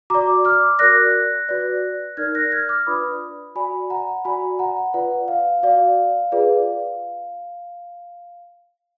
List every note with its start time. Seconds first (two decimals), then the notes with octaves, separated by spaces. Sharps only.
0.10 F#4 D5 A#5 D6
0.45 D6 F6
0.79 F#4 A#4 D5 F#6 A#6
1.49 F#4 B4 D5
2.17 D#4 A#4 D5 F6 G#6
2.35 F#6 A#6
2.52 F6 G#6
2.69 D6 F6
2.87 D4 F4 B4 D5 B5 D#6
3.56 F#4 D5 G#5 B5
3.90 F#5 A#5
4.25 F#4 D5 G#5 B5
4.59 F#5 A#5
4.94 F4 B4 D5 F#5
5.28 F5
5.63 F#4 D5 F5
6.32 F4 G#4 B4 D5